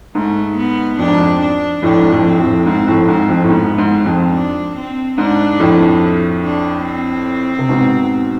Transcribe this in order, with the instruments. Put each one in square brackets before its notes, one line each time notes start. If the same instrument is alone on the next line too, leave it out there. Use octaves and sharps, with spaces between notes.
[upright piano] G#2 [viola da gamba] A3
[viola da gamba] B3
[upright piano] F2 [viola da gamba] D4
[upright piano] G#2
F2
[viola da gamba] D4
[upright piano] F2 A2 [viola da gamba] D4
[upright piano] G#2
F2 A2
[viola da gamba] C4
[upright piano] F2 A2
[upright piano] G#2 [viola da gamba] C4
[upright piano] F2 A2
[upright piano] G#2 [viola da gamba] C4
[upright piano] F2
A2
[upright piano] G#2 [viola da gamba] B3
[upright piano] G#2
[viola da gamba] C4
[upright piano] F2
[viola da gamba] D4
C4
[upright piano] G#2 [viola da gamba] D4
[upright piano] F2 A2
[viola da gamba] D4
C4
[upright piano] C3
G#2 B2